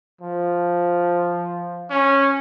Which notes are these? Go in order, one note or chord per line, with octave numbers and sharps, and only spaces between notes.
F3
C#4